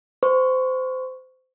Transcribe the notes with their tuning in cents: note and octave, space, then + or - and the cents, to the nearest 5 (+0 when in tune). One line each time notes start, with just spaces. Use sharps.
C5 -25 C#6 +0